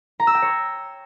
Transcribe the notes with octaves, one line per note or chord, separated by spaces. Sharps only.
A#5
E6
G5
C#5